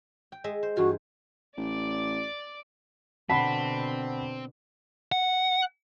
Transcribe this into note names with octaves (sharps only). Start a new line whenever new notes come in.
G5
G#3 D#5 E5
C5
G2 E3 F4 F#4
A1 D5
B2 D3 C4 F#5 A5 B5 B6
F#5